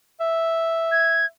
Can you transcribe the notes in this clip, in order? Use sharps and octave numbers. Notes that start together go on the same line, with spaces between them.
E5
G#6